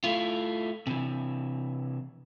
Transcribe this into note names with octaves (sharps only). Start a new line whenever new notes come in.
A3 E4 F4
C3 E3